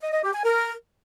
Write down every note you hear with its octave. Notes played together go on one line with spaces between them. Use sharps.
D#5
D#5
G4
G#5
A#4